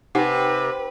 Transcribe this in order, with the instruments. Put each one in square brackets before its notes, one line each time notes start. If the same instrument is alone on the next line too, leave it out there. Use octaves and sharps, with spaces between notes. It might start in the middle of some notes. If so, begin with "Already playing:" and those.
[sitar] C3 [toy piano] D#4 G4 F#5 [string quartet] B4